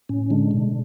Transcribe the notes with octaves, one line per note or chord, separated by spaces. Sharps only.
A2 C#4
D3 G#3 D4
B2